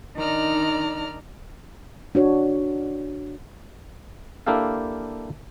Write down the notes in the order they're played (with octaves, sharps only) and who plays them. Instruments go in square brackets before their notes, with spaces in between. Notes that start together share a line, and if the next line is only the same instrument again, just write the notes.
[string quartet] D#3 D4 D#4 D5 A#5 F6
[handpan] D4 F#4 C#5
[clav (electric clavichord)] A#3 D4 E4 G4 A4 F5